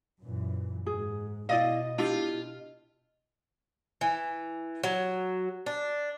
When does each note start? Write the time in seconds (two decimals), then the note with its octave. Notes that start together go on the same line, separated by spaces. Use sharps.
0.21 F#2 A#2 E3
0.86 G#2 G#4
1.49 B2 E4 D5 D#5 F5
1.98 D4 E4 F4 G4
4.01 E3
4.84 F#3
5.66 D4